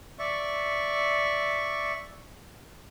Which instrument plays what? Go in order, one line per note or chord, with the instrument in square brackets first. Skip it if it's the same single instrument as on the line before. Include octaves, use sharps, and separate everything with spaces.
[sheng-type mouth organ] D5 E5 C#6